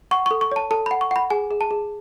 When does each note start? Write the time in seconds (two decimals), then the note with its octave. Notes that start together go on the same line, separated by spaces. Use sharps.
0.11 F#5 C#6
0.26 C#6
0.31 A4
0.41 C#6
0.52 C#5 A5
0.71 A4 A5
0.86 B5
0.91 F#5
1.01 C#6
1.11 F#5 B5
1.30 G#4 G#5
1.51 G#4
1.61 A5
1.71 G#4